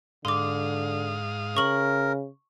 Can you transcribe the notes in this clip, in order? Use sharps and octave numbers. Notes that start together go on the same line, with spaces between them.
G#2 D3 F5 C6 D6 D#6
C#3 A#4 C#6 F#7